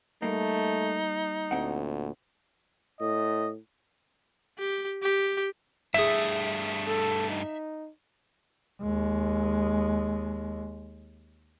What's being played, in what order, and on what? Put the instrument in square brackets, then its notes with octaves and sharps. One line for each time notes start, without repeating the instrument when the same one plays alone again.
[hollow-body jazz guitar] G3 A#3 [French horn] A3 [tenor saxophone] D#4
[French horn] D2 [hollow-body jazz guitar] A#2 C4 F#5
[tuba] A2 [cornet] D#5
[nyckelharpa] G4
G4
[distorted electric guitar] G2 A3 [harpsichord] E4 G#4 [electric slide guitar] E5
[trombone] A4
D#4
[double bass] D#2 G#3